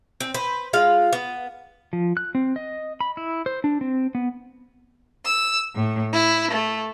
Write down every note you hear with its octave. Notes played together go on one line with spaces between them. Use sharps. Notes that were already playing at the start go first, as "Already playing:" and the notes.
C4
B4 C5
G#3 F4 F5
B3
F3
F#6
C4
D#5
B5
E4
C5
D4
C4
B3
E6
A2
E4
A3